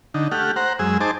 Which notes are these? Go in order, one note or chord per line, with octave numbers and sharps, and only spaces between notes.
D3 D#4
A3 G4 F#5 F6
C5 F#5 A#5
F#2 G#3 G#4 E6
D#4 G#4 C5 A5 D6